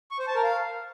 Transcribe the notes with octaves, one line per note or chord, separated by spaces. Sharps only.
C#6
C5
A5
A#4
F5